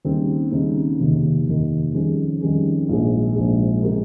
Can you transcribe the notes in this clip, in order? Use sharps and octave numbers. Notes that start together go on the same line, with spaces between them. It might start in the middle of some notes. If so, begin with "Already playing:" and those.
D#2 C#3 G3 C4 D#4
D#2 C#3 G3 C4 D#4
F1 D#2 D#3
F1 D#2 D#3
F2 D#3 G3 C#4 G#4
F2 D#3 G3 C#4 G#4
A#1 G#2 F3 G#3
A#1 G#2 F3 G#3
C#3 G#3 C#4 G4 A#4